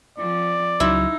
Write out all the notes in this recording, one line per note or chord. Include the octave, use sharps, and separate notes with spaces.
F3 C4 D5
C#2 F#3 D#4 E4 C6